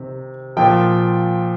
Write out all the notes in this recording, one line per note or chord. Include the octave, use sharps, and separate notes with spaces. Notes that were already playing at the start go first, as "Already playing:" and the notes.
Already playing: C3 D#3
A#2 F3 G5